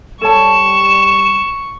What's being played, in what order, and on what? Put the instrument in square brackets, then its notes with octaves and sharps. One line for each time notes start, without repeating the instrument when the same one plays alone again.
[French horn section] G3 [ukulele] A4 C#5 A5 [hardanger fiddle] C#6 [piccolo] E7